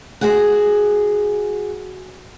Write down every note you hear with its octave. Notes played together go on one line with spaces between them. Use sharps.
F#4 G#4 F#5